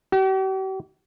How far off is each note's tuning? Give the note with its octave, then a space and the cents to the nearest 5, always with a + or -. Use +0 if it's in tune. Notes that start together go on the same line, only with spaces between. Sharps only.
G4 -45